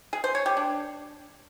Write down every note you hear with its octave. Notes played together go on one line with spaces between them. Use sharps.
G#4
C5
C#5
G4
D4